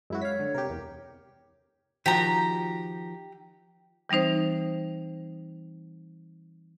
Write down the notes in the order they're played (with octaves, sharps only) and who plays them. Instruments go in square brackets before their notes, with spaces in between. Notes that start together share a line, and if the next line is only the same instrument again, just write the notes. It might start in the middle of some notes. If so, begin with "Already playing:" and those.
[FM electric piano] F#2 E4 F#4 [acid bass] G#3
[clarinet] C#5 [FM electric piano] F5 B6
[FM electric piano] D3
[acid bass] C3 [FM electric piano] G4 A#4
[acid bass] E2
[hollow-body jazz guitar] D#3 F3 F#4 [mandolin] G4 A#5
[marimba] E3 G3 C4 D#4 C5